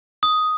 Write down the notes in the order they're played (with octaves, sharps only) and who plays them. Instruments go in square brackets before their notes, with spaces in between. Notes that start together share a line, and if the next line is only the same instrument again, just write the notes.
[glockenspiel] D#6